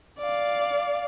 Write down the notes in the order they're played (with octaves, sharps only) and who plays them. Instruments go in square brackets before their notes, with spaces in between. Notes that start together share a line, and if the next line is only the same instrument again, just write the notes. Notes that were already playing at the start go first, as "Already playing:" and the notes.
[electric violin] D5 F5